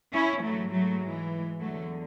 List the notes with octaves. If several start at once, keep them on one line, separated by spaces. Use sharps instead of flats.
C#4 E4
G#2 E3 F#3 A3
F#3 A3
E3 G#3
E2 D3 F#3 A3